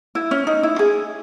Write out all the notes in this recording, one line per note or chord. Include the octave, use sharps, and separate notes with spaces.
E4
C#4
D#4
E4
G#4